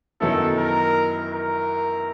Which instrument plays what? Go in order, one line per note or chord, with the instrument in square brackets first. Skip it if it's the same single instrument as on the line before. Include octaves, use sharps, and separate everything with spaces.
[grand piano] F#2 D#3 F#3 B3 E4 [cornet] A4
[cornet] A#4
A#4